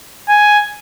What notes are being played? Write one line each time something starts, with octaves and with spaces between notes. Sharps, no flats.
G#5